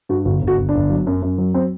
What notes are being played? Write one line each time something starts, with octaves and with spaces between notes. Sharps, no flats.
G2 F#4
G1 F#4
G1
F#4
G1
D4
G1
F#3
F#2
F#2
F#3
F#3 C4